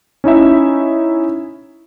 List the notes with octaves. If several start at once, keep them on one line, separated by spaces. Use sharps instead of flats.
C#4 D#4 E4 E5